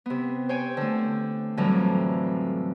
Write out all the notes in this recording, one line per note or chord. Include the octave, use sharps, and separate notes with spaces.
C3 B3
C5 C#5 G5 G#5
D3 A3
F2 A2 D3 E3 F#3 G3